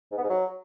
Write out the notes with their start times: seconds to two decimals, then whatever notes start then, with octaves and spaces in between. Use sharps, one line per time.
0.12 G#2
0.18 B3
0.24 G#2
0.30 F#3